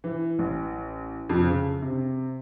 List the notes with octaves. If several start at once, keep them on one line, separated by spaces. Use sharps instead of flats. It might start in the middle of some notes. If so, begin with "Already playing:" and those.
E3
A1
F2
C#3
C3